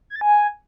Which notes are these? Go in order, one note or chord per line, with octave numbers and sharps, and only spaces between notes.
G#6
A6
G#5